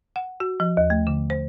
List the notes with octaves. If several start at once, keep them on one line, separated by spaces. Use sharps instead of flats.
F#5
F#4
F3
D#2
A3
D3
C5